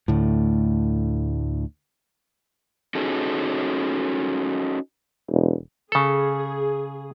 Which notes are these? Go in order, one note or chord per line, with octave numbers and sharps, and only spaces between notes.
D2 A2
C#4 D#4 F#4 G#4 A4
E1
C#3 G#4 A4